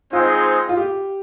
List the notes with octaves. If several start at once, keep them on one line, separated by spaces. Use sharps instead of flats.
G#3 C4 D#4 F4 G#4 C5
F4
G4